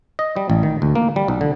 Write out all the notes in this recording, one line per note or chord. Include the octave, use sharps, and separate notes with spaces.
D#5
G3
A1
D#3
D2
A#3
G3
B1
D3